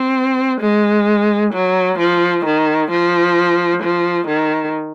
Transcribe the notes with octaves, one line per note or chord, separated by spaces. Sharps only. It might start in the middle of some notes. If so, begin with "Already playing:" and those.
Already playing: C4
G#3
F#3
F3
D#3
F3
F3
D#3